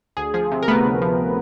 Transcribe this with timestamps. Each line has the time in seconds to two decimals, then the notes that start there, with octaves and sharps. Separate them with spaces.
0.17 D2 G#4
0.34 F3 G#4
0.52 C3
0.62 A#4
0.68 A3 B3 B4
0.85 D2
1.02 F3